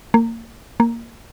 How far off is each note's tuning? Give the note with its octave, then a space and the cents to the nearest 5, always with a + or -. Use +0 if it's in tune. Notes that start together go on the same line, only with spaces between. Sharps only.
A#3 -30
A#3 -5